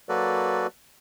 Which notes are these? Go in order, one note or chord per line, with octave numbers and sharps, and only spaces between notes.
F#3 A#3 F#4 A4 B4 D5